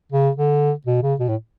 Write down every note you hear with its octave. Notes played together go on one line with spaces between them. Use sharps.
C#3
D3
B2
C#3
B2
A2